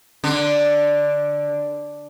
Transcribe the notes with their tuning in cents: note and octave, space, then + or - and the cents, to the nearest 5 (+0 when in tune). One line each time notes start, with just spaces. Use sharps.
D3 +0 D4 +0